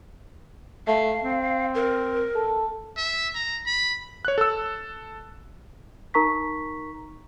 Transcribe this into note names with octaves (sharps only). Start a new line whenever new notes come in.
A3 F5
C4
A#4
A4
E5
A#5
B5
C#5 F#6
A4 E6
D#4 A#4 A#5 C#6 B6